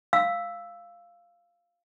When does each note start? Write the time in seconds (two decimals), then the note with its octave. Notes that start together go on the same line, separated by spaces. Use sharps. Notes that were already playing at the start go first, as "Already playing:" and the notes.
0.13 F5 E6